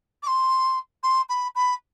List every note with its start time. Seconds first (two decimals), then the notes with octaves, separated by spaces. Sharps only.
0.23 D6
0.27 C6
1.03 C6
1.29 B5
1.55 B5